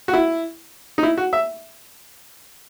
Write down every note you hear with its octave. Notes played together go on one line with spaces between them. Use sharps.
F#4
E4
D#4
E4
F#4
E5